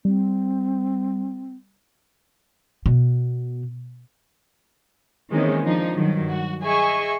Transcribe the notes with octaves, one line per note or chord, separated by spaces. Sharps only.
G3 C4
B2
D#3 E3 G#3 A#3 C4 C#4
F3 D4 D#4
G2 D#3 F#3
F#4
G#4 D#5 E5 G#5 C#6